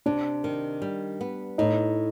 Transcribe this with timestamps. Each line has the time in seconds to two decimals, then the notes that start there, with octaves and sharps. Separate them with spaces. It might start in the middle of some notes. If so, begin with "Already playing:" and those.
0.06 C3 D4
0.44 D#3
0.82 G3
1.21 B3
1.58 A2 D#4